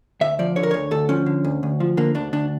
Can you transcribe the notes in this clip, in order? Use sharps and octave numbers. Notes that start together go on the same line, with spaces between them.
D2 E5
F3 D5
D3 C#5
A#4
D2 C#5
D2 A4
F3 C#4
D3
D2
D2
F3
D3 A#3
D2 D4
D2 D4